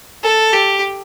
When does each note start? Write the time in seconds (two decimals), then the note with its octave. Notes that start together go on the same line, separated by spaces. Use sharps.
0.24 A4
0.53 G4